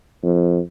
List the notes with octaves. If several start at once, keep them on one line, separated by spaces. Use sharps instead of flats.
F2